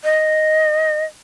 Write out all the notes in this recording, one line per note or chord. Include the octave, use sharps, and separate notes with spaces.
D#5